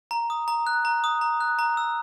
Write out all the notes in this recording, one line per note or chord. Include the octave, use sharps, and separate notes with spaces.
A#5
D#6
A#5
F#6
A#5
D#6
A#5
F#6
A#5
E6